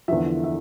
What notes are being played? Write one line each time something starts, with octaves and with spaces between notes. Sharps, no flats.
E2 D3 F3 E5
E5